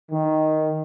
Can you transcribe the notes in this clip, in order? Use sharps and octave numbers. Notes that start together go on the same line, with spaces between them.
D#3